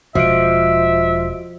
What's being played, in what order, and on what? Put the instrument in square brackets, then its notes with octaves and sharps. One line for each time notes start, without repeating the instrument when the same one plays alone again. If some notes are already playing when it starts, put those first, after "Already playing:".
[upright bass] E1 [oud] F3 [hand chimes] F#4 D#5 D7 [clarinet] E5